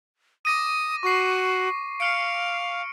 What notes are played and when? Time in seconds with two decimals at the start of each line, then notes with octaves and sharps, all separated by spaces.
0.45 D6 D#6 A#6 D#7
1.03 F#4 C#6 C7
2.00 F5 F6 C#7 D7